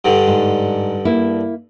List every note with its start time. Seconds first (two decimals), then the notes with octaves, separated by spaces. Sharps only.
0.05 G2 D3
0.27 G#2
1.05 A#3 E4